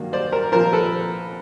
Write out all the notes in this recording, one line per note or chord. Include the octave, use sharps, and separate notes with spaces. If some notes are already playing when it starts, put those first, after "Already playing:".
Already playing: G2 D#3 F#3 A#3
C5 D5
A#4 C5
A#1 A#2 F3 A#4 C5
A4 B4